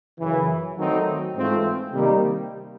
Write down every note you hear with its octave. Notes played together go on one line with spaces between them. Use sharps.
F#2 C#3 E3
D#3 F#3 A3 C4 D#4
G#2 E3 A3 C4 F4
C3 D#3 G3 A#3 D#4